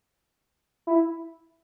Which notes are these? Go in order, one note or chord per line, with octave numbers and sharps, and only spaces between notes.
E4